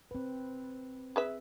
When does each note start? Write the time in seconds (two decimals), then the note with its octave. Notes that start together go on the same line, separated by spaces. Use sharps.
0.11 C4 B4
1.16 G#4 B4 E5